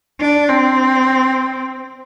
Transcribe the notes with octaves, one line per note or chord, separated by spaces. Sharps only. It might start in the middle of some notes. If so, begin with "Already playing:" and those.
D4
C4